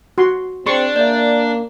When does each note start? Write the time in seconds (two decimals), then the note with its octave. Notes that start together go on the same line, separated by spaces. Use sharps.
0.18 F#4 C6
0.67 C4 D4 G#4 C6 C#6
0.96 A#3 D5 E5